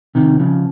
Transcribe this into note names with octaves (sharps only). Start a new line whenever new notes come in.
C3 D#3
C#3 F3